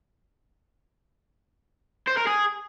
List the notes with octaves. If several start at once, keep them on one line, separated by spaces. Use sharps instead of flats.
C5
A#4
G#4